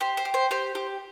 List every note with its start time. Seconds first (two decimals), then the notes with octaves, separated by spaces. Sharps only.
0.01 G4 C5
0.17 C5
0.25 G4
0.34 C5
0.51 G4 C5
0.75 G4